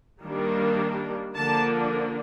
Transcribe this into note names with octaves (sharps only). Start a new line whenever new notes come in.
D#3 G3 A#3 D4
D3 F3 A#3 D4 A5